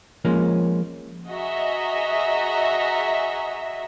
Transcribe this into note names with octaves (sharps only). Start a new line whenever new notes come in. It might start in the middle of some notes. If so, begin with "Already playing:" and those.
F3 G#3 A#3 C#4
F#4 G#4 D#5 E5 A#5